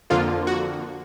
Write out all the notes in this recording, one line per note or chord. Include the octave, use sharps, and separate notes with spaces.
F2 D3 F3 A#3 F4
F#4